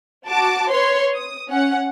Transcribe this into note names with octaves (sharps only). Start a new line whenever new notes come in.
F#4 A5 D6
B4 C#5 C6
D#6
C#4 F#5